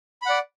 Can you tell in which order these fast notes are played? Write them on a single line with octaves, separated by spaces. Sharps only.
B5 F#5 D5